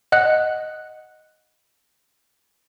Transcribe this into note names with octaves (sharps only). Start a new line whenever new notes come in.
D#5 F#5 F#6